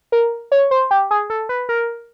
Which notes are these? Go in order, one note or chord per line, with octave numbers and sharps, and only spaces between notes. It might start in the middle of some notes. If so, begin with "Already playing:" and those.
A#4
C#5
C5
G4
G#4
A4
B4
A#4